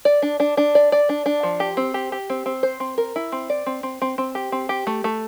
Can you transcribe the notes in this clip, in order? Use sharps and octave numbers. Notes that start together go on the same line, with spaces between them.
D5
D4
D4
D4
D5
D5
D4
D4
F3
G4
C4
G4
G4
C4
C4
C5
C4
A#4
E4
C4
D5
C4
C4
C4
C4
G4
C4
G4
A3
A3